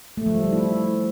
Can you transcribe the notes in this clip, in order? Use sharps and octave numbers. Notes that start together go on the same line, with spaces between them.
A3
F3
G3
F3
E4